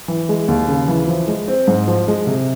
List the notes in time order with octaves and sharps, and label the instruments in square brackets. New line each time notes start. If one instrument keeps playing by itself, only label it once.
[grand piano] E3
G#3
D#2
C#3
E3
F3
G#3
C4
G#2
F3
G#3
C3